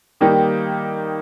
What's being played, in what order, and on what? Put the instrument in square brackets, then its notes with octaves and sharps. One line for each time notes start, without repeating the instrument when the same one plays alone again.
[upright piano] D#3 G3 A#3 D#4 G4